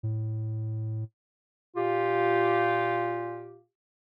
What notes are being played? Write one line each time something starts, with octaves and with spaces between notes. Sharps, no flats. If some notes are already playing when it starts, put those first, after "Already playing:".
A2
A#2 F4 G4